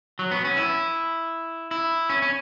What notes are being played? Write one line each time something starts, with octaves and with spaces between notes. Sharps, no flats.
F#3
B3
C#4
E4
E4
C#4
C#4